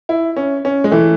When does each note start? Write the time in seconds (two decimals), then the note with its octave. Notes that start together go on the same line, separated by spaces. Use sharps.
0.09 E4
0.37 C#4
0.65 C#4
0.84 G#3
0.91 E3 A3